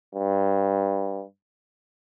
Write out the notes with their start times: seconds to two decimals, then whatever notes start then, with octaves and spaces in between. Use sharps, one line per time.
0.15 G2